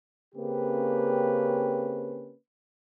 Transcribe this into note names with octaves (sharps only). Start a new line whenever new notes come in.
C#3 A#3 C4 C#4 G4 B4